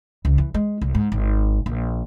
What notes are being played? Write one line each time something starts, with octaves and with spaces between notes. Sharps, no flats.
C#2
E3
G#3
C2
G#2
G#1
A#1